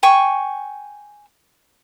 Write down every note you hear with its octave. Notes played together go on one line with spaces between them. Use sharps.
G5 G#5 C#6